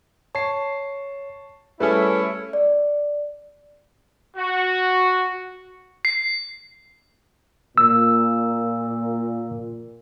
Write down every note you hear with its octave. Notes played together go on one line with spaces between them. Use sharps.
C#5 A5 C#6 C7
G3 A3 C#4 E4 G#4 A4 B4
D5
F#4
C7
A#2 E6